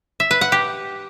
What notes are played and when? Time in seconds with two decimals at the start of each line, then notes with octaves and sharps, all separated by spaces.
0.20 E5
0.31 B4
0.41 F#5
0.52 G4